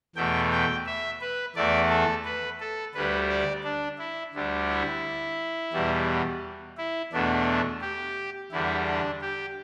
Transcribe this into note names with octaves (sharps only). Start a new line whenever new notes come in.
E2 B2 A3 G5
G5
E5
B4
E2 E3 A3 D5
A4
B4
A4
D2 D3 G3 B4
D5
D4
E4
D2 D3 G3
E4
E2 B2 G3
E4
E2 B2 A3 D4
G4
E2 D3 G3 E4
D4
G4